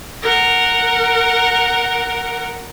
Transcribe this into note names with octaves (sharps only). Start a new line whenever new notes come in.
A#4 F#5